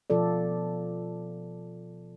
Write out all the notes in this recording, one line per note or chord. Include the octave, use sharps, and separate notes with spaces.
B2 F3 F4 A4 D5